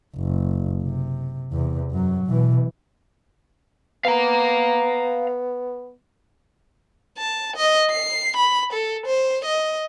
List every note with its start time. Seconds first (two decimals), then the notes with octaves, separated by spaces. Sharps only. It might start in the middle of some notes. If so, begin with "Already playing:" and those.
0.17 F#1
0.83 C3
1.52 E2 C3
1.91 F#2 F#3
2.26 B2 E3
4.05 B3 F5 A#5
7.18 A5
7.57 D#5
7.90 C7
8.36 B5
8.73 A4
9.06 C5
9.45 D#5